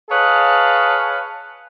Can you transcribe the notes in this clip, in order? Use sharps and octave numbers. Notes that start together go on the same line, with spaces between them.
G#4 B4 C#5 D#5 F5 A5